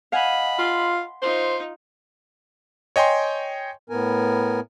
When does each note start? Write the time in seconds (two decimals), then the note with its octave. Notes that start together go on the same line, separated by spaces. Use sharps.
0.12 D#5 F5 F#5 G#5 B5
0.59 F4 C6
1.22 D#4 F4 C5
2.96 C#5 D#5 G5 G#5 C6
3.90 A2 B3 A#4 G#5